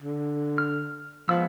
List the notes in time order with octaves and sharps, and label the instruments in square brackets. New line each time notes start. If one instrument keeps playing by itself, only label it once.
[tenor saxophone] D3
[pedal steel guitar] F6
[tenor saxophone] F3 [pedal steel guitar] G#3 B3 E6